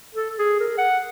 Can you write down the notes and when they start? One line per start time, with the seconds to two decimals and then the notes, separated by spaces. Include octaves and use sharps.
0.15 A4
0.39 G#4
0.60 A#4
0.78 F#5